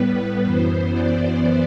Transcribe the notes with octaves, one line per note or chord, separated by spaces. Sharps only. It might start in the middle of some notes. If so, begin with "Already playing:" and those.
Already playing: A2 G3 B3 B4
F#2 E3 B3 C5
D5